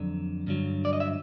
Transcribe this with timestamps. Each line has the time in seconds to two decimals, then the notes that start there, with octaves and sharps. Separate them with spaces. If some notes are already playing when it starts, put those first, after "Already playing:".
Already playing: F2 D3 F#3
0.47 G2 D3 F#3
0.85 D5
0.93 D#5
1.00 E5